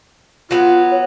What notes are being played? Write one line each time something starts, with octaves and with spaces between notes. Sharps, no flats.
F#3 B3 F4
C#5